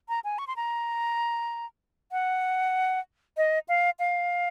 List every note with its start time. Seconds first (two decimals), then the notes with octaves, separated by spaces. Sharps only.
0.09 A#5
0.24 G#5
0.39 C#6
0.47 C6
0.56 A#5
2.12 F#5
3.37 D#5
3.68 F5
3.99 F5